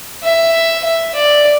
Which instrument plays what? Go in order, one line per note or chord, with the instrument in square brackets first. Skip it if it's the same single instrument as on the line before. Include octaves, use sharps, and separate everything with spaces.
[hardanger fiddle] E5
E5
D5